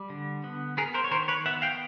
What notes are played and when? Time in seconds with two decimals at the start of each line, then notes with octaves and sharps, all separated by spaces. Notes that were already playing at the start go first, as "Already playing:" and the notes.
Already playing: G3
0.10 D3
0.44 B3
0.77 B3 G#4 A#4
0.94 A#4 C5
1.04 C#5
1.11 D#3 A#4 C5
1.28 B4 C#5
1.46 B3 E5 F#5
1.62 F5 G5